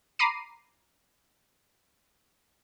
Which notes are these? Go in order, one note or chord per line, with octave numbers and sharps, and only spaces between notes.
A#5 B5 D6 C7 D#7